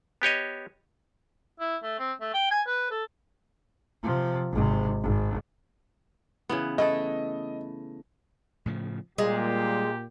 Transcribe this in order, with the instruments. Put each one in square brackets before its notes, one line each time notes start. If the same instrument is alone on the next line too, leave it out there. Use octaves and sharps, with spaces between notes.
[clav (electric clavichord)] B3 G4 C#5 D#5
[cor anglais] E4
A3
C4
A3
G5
G#5
B4
A4
[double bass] C3 F3
G#1 C3
G#1
[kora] C#3 E3 B3
[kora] A3 E4 A4 [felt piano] D#5
[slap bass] A2 C#3 F3
[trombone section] A#2 [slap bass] G3 [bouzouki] G#3 [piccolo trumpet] G4